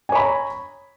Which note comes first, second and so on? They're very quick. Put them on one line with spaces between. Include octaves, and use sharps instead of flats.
G#5 C#5 B5 A#5